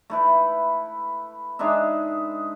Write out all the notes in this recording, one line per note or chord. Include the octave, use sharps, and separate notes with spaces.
A3 E4 B4
G#3 D4 D#4 E5